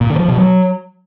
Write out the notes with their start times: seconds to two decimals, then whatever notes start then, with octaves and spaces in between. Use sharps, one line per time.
0.01 A#2
0.10 D3
0.19 F3
0.28 B2
0.37 F#3